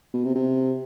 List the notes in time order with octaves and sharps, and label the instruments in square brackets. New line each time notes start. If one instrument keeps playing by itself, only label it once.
[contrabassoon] B2
C3
C3